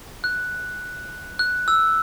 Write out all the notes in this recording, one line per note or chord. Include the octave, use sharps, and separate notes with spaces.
F#6
F#6
E6